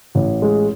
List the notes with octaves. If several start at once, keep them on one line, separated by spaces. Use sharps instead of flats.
A1
G#3